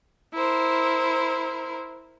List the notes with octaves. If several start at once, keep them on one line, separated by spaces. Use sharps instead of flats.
E4 A#4 C5